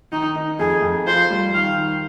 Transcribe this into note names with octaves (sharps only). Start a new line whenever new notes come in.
D#3 D#4
D#4
F2 G#4
F2
F4 C5
G3
D#3 F5
D#3